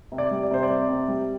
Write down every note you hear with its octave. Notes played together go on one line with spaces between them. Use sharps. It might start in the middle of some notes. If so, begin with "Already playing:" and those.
C3
D5
G3
D5
C3 C5
D5
C4
C3
G3